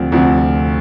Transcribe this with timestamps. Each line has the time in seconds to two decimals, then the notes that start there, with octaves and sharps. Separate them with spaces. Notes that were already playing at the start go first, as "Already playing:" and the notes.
Already playing: D2 C3 F3 C4
0.12 D2 C3 F3 C4